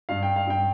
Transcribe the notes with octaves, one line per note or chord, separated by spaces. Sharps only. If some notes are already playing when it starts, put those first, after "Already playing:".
G2 F5
G5
F5
G2 G5